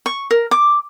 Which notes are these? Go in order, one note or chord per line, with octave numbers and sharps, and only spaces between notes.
C#6
A#4
D6